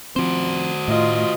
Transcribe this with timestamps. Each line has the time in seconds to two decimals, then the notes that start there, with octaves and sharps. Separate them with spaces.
0.16 F3 C4 F#4 C5
0.88 A2 F4 D#5